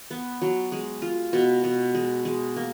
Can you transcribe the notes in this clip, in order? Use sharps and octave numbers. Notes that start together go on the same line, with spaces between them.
B3
F#3
G#3
F4
B2
B2
G#3
G#3
A#3